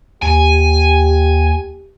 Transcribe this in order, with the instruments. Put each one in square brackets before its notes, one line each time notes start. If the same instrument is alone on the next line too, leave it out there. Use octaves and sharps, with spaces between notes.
[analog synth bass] D#2 [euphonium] G4 [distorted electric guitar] G#5